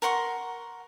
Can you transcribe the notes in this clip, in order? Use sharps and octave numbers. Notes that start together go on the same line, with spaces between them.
A#4 F#5 C6 C#6